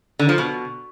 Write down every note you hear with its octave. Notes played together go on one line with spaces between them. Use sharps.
D3
F3
B2